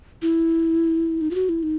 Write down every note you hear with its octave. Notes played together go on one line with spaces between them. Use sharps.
E4
D#4
F4
F#4
E4
D#4